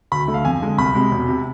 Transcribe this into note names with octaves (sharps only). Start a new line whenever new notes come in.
D2 B5
D3 A3
F5
F2 G#5
D3 G#3
C2 B5
C3 G#3
E1
C3